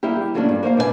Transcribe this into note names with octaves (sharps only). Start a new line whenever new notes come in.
G3 A#3 E4 G4
G3
F3 F#3 A3 A#3 C#4 D4
G2
A#3 C5 C#5 F5
B2 D4 B4 D#5 G#5 A5